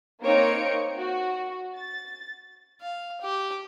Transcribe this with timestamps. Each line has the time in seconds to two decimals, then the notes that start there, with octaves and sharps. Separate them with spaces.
0.23 A#3 C4 D#4 C#5 C#7 D7
0.97 F#4
1.77 A6
2.81 F5
3.21 G4